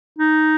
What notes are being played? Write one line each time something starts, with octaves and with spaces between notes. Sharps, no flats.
D#4